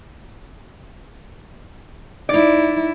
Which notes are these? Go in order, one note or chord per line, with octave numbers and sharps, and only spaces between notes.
D#4 E4 D5